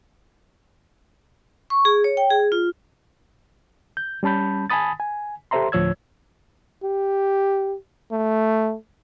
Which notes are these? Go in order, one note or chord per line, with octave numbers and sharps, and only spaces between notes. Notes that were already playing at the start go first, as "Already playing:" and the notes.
C#6
G#4
C#5
G5
G#4
F4
G6
G3 C#4 A5 B5 G6
G#5 A5 B5 D#6 A6
G#5
G4 A4 C5 E5 A#5 C6
D2 A2 F3 C#5 E6 G#6
G4
A3